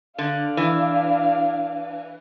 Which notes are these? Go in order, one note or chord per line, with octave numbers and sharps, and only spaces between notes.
D3 D4 F5
E3